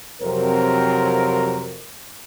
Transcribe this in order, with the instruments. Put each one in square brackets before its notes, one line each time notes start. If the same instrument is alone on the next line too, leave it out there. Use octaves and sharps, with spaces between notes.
[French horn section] F2 C3 F#3 A#4 C5